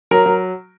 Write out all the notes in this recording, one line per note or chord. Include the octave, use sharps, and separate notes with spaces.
F#3 A#4
F#3